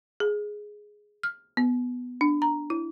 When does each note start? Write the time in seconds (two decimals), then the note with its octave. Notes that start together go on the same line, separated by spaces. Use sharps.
0.20 G#4
1.23 F6
1.57 B3
2.21 D4
2.42 A#5
2.70 E4